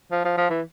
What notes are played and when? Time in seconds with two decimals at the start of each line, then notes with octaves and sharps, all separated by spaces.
0.12 F3
0.24 F3
0.37 F3
0.50 E3